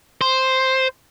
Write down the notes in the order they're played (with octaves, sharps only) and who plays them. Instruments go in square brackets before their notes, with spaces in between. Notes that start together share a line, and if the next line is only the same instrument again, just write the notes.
[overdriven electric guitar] C5